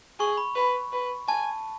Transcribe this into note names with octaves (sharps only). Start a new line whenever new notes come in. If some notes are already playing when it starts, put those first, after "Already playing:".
G#4 C#6
B5
B4
B4
G#5 A5